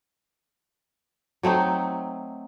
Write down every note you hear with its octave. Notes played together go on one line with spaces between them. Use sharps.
F#3 A3 C4 D#4